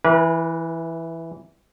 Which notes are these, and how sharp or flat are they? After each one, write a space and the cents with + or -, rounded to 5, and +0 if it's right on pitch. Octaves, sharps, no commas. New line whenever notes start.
E3 +0 B4 -40